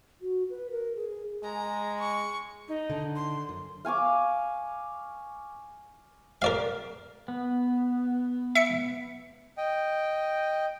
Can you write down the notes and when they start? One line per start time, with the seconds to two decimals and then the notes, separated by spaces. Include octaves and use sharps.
0.21 F#4
0.50 B4
0.71 A#4
0.96 G#4
1.43 G#3 A#5
2.00 C#6
2.68 D#4
2.90 D3
3.16 C6
3.49 F#2
3.85 F5 G#5 C#6 D6
6.42 A#4 D5 F5
7.28 B3
8.55 E5 C#7
9.58 D#5 G5